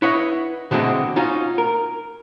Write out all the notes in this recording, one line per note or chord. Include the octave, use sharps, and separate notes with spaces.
E4 B4 C#5 D#5 F#5
B2 D3 E3 G#3 C4 F#4
C#4 D#4 F4 F#4
A#4